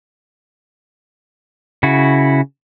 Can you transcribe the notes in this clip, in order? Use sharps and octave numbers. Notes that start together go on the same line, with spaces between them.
C#3 E4 F#4